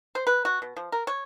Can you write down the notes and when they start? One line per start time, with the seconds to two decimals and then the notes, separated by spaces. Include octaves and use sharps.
0.15 C5
0.27 B4
0.45 F#4
0.62 B2
0.77 F3
0.92 A#4
1.07 C#5